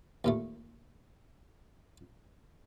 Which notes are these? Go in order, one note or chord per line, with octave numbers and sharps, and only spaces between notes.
D#2 A#2 A3